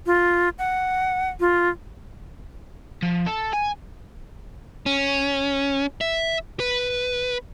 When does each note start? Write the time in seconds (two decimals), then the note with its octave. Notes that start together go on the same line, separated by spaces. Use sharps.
0.06 F4
0.59 F#5
1.40 F4
3.02 F3
3.26 A4
3.53 G#5
4.86 C#4
6.01 E5
6.60 B4